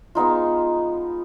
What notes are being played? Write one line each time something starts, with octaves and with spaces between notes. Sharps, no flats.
G#3 B3 D#4 F4